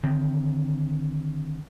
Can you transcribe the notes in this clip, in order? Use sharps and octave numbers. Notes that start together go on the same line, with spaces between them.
D3 D#3 C4